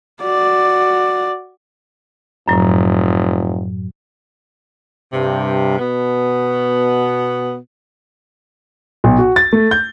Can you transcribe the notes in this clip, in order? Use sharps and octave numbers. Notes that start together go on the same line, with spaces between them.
F#4 D5
F1 F#2 A2 F#3
G2 C3
B2 B3
B1
F#4
A6
A3
G6